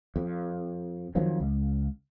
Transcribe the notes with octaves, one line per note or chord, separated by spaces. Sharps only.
F2
F2 D#3 F3 F#3
C#2